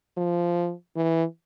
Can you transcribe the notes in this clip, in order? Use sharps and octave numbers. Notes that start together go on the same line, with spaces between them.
F3
E3